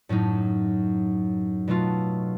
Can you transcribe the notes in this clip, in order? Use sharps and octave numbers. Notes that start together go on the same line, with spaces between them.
F#2 A2 F#3 D#4
B2 F#3 A3 F4